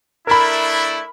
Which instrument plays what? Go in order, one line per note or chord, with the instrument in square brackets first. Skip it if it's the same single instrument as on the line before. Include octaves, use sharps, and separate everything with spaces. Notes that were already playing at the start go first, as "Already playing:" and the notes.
[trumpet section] A3 D4 E4 [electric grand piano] A#4 B5